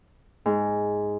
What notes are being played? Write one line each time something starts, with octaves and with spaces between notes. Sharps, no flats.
G#2